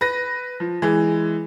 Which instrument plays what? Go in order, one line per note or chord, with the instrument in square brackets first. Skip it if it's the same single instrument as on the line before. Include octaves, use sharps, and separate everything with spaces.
[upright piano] B4 A#6
F3
E3 G#3